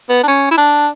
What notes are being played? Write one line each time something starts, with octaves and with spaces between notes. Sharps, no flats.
B3
D4
C#4
E4
D4